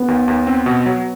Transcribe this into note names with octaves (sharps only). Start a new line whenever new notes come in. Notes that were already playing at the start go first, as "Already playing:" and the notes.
Already playing: B3
D#2
D#2
C4
B2
F#3